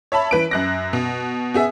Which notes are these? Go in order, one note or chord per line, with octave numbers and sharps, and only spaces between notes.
C#5 E5 A5 B5
E3 B4 D7
F#2 F#6 A#6
B2
B3 G#4 E5